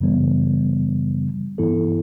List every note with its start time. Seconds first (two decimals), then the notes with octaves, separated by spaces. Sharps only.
0.01 F#2 C#3 E3 G3 B3
1.58 G2 E3 B3 E4 A4